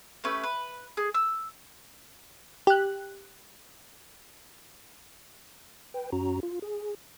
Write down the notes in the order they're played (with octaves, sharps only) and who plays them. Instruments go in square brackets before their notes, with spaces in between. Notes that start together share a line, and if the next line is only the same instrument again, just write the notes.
[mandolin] A3 C#4 G4 B4
B4
G#4
E6
[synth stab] G4 F#6
[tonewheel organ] B4 G5
F#2 C#4 F#4 A#5
F4
G#4